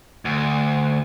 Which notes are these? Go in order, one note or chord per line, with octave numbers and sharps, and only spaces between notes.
D2